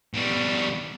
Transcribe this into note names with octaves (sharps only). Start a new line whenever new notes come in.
B2 G3